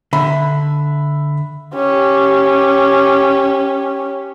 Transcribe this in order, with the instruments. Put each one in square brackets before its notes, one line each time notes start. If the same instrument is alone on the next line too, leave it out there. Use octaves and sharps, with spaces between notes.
[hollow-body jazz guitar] D3 [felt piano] E5 B5
[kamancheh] C#4 G4